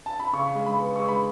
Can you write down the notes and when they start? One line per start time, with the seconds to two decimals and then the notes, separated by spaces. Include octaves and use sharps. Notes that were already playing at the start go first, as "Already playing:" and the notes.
0.06 A5
0.20 B5
0.33 C#3 C#6
0.55 G#3
0.66 B5
0.77 B3
0.96 G#3 C#6
1.08 B5